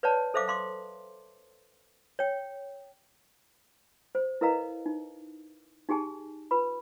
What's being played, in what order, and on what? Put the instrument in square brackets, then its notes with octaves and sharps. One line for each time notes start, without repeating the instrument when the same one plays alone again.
[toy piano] B4 C#5 D5 F#5 A5
A4 C5 E5 F5 D6
F5 C6 D6
C#5 G5
C5
E4 A#4 B4 D#5 F5 A#5
D#4
D#4 G4 G#4 G#5 A5
F4 B4 B5